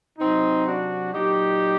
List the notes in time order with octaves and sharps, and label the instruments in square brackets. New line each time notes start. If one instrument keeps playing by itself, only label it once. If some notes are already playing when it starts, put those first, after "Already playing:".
[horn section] C3 F#3 C4 D#4
D4 F#4
A#2 F#3 D#4 G4